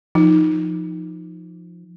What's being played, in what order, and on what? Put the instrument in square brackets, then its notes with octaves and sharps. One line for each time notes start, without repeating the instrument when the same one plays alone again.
[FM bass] F3 [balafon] D#4